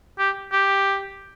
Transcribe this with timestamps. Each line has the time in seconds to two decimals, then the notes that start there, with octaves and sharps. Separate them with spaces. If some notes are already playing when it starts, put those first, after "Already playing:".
0.18 G4
0.52 G4